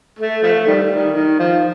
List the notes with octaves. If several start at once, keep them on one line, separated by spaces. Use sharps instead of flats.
A3
F3 A3
D#3 G3
D#3
D#3
F3